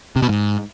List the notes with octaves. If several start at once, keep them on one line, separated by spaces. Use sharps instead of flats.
C3
B2
G#2